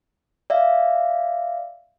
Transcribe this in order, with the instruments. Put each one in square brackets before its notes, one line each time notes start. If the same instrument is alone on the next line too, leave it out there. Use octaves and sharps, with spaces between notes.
[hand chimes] D5 E5 F5